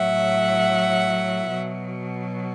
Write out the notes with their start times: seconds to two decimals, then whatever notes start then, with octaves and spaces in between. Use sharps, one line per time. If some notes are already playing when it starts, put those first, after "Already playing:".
Already playing: A2 F#3 E5 F#5
1.50 B2 F#3